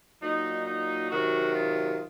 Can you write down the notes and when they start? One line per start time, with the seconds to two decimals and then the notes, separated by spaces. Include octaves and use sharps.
0.22 A#2 F#3 D#4
0.66 D#4
1.11 C3 D#3 F#3 F#4
1.55 F4